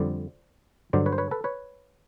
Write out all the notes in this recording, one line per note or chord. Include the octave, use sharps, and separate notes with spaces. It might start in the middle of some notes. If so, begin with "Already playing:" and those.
Already playing: F2 D3 G3 C5 D5
G2 D3 F#3 C5 D5
B4 C#5
C5
B4 C#5
A4 B4
B4 C#5